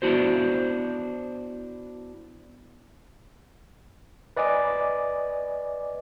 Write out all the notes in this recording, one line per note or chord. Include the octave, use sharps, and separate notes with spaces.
B3 D4 E4 F#4 C5
B4 D5 D#5 G#5 D6